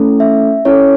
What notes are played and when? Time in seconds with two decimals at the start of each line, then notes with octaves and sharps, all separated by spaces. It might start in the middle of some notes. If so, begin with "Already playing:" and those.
Already playing: A3 C#4 E4 A4
0.20 E5
0.65 C#4 E4 A4 C#5